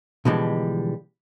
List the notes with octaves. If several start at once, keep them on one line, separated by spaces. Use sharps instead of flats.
B2 D3 E3 F3 G3 G#3